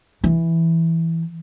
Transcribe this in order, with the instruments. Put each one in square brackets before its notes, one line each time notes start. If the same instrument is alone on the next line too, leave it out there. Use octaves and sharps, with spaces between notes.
[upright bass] E3